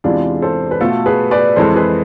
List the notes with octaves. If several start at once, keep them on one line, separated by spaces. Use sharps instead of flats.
E2 C3 E3 G#3 D4 F4
A4 C5
B4
B2 A3 F4 A4
G#4 B4
B4 D5
F2 E3 G#3 A4 C5
G#4 B4